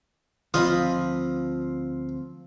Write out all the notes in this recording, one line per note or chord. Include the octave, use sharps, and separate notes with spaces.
D2 F3 C4 F4 D#5 B5 D#6